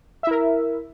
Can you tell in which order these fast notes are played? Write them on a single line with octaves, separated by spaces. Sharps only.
E5 E4 A#4